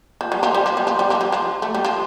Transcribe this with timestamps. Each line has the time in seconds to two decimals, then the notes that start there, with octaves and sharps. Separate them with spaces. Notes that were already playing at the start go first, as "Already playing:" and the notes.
0.21 F3
0.32 G3
0.43 F3
0.55 G3
0.66 F3
0.77 G3
0.87 F3
0.99 G3
1.10 F3
1.21 G3
1.32 F3
1.62 A3
1.74 G3
1.85 F3